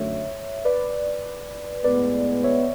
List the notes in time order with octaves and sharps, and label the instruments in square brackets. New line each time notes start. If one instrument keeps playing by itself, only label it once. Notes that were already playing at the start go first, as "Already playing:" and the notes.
Already playing: [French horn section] F#2 D3 A3 [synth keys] C#5 E5
[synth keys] B4 D5
[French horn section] A2 G#3 B3 [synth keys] B4 D5
[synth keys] C#5 E5